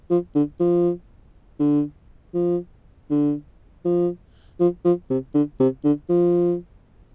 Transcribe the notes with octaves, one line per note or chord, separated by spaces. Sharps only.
F3
D3
F3
D3
F3
D3
F3
F3
F3
C3
D3
C3
D3
F3